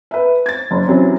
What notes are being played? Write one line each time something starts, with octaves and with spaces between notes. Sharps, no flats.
B4 E5
G#6 A6
F#1
F#2 C3 E3 F#3